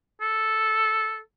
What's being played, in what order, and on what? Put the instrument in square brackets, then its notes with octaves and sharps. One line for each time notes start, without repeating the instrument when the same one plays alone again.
[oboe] A4